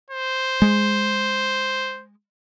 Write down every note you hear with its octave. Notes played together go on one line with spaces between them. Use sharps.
C5
G#3